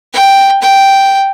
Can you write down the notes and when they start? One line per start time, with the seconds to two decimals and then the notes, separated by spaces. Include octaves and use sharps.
0.13 G5
0.62 G5